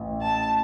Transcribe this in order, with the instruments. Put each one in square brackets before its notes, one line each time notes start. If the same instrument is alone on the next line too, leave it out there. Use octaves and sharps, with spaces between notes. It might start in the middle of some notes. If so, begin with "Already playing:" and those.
Already playing: [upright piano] A1
[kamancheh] A5